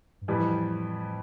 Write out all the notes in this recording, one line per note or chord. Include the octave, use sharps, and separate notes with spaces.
G2
F2 A2 E3 G3